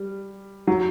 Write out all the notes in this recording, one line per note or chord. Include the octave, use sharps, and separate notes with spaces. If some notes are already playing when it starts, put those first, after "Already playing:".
Already playing: G3
F#3